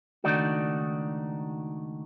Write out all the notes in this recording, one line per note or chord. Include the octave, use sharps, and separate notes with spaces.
C#2 D#3 A3 D4 D#4 F#4